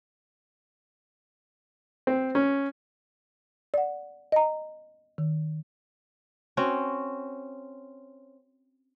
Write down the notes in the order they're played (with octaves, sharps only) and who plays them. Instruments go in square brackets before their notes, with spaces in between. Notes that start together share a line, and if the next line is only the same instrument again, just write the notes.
[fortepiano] C4
C#4
[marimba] D5 F#5
D#5 A#5
D#3
[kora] C4 C#4 F#4